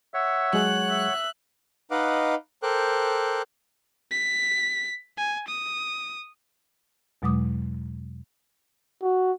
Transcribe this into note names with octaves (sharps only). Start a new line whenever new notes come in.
C#5 E5 F#5
F#3 G#3 G#4 F#6
E5
D#4 B4 D#5 F5 F#5 D6
A4 A#4 C5 G5 D6 F#6
B6
G#5
D#6
E2 B2 F#3 G#3 D6 D#6
F#4